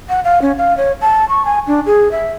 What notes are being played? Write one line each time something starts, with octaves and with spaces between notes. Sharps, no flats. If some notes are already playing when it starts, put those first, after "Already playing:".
F#5
F5
C#4
F5
C#5
A5
C#6
G#5
D4
G#4
E5